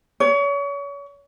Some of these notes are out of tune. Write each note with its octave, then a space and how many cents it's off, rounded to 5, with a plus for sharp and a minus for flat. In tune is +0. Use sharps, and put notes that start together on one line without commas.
C#5 +35